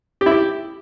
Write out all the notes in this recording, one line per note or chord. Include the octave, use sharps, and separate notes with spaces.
G4
E4
G4